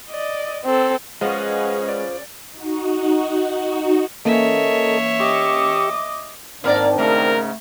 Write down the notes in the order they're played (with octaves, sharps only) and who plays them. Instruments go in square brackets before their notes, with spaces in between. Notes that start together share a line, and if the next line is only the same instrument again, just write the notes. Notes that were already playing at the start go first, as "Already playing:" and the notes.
[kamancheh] D5 D#5
C4 A4
[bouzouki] F3 [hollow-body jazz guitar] G#3 [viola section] C#4 G#4 B4 [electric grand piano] D#5 F5 F#5
[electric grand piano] D5
[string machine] D#4 F#4
[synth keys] E3 A#3 C#4 [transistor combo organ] A4 A#4 D#5 [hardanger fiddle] C#5 E5
[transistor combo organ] G4 C#6 E6 [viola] D#5 D6
[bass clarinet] G#2 [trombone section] D#3 C4 D4 [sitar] A#3 A#4 D5
[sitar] G#2 C#3 [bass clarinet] A3 [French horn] A#4